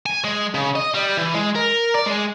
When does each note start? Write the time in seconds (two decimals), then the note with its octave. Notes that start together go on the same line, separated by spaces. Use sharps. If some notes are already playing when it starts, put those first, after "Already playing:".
0.06 G#5
0.24 G#3
0.55 C#3
0.76 D#5
0.94 G3
1.17 E3
1.34 G#3
1.55 A#4
1.95 D5
2.07 G#3